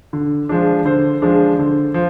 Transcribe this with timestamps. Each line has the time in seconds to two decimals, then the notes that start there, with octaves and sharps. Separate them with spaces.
0.13 D3
0.49 F3 G#3 D4
0.85 D3 C5
1.22 F3 G#3 D4
1.59 D3
1.94 F3